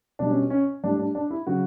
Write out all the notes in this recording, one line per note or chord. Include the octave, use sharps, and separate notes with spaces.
B2 G3 D4
C#4
C#4
A2 G3 D4
D4
D4
E4
C#3 F#3 F#4